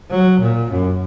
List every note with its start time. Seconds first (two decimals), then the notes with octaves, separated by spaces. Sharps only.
0.10 F#3
0.40 A#2
0.71 F#2